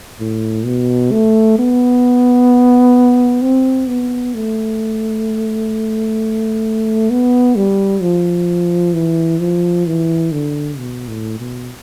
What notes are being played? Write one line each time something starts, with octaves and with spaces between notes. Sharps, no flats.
A2
B2
A3
B3
C4
B3
A3
B3
G3
F3
E3
F3
E3
D3
B2
A2
B2